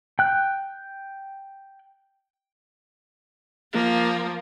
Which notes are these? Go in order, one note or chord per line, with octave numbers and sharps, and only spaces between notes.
G5 F#6
F3 A#3